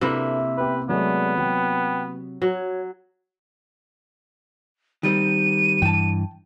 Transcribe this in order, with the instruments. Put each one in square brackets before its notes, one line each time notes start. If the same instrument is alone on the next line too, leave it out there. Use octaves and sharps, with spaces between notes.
[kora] C3 A#3 E4 [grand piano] D4 A4 B4 [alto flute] E5
[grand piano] B3 G4 [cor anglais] B4
[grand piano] F#3 G#3 A3 [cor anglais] B3 [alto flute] D5
[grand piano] F#3 [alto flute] G5
[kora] F#3 [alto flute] C#5
[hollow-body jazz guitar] D#3 G3 C4 [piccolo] D#7
[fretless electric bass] G2 E3 [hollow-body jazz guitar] G5 A5